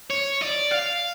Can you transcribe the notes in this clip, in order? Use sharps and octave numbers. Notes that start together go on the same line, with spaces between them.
C#5
D5
F5